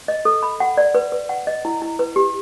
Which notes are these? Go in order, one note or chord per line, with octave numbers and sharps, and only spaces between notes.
D#5
A4
B5
F#5
D5
B4
B4
F#5
D#5
E4
E4
B4
G4